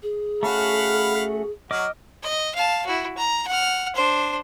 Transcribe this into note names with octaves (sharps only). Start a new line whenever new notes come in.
G#4
A3 C#4 F#4 F5 F#5 B5
F#3 F#4 D#5 D6 F6
D#5
F5 A5
E4 F#4
A#5
F#5 F6
D4 C5